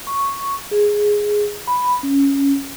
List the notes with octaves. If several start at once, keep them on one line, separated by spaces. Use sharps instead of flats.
C#6
G#4
B5
C#4